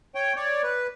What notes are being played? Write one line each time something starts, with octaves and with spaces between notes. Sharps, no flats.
C#5 G5
C#5 D5
B4